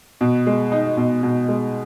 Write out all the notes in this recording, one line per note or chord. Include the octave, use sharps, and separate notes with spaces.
B2
G#3
D#4
B2
B2
G#3